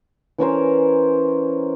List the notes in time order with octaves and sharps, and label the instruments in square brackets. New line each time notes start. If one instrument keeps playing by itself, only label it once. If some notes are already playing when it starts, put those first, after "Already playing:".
[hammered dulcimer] E3 C#4 A#4 C5